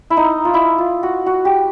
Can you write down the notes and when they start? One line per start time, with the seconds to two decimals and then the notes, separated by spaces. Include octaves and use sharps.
0.10 E4
0.17 D#4
0.45 F4
0.54 E4
0.78 F4
1.03 F#4
1.26 F#4
1.45 G4